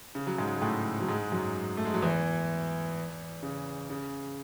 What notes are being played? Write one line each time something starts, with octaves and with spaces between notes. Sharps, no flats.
C#3
F#3
G#2 G#3
G#3
A2 A3
F#3
G#2 G#3
F#2 F#3
A3
G#3
F#3
E2 E3
C#3
C#3